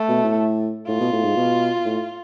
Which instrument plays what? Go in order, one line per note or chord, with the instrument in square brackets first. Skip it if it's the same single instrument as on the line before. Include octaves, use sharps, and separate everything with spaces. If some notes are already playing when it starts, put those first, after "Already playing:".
Already playing: [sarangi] A3
[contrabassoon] B2
A2
[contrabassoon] A2 [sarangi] F4
[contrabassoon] B2
A2
G#2
B2
A2